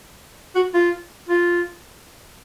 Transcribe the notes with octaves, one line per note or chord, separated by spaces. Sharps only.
F#4
F4
F4